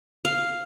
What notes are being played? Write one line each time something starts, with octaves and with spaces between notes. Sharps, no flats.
F5